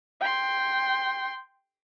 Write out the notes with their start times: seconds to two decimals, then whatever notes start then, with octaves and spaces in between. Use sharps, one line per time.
0.21 G5 C6